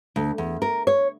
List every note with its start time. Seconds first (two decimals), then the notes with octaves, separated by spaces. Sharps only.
0.16 D2
0.38 E2
0.62 A#4
0.87 C#5